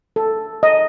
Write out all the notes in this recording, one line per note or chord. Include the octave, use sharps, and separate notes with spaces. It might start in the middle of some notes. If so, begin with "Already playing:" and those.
A4
D#5